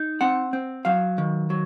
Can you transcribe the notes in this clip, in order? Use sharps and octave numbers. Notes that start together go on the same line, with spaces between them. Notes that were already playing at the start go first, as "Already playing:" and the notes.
Already playing: D#4
C4 F#5
C4
F#3 F5
D#3
F#3